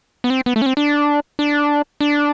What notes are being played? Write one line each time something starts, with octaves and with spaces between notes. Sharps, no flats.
B3
C4
B3
A3
C#4
C4
D4
D4
D4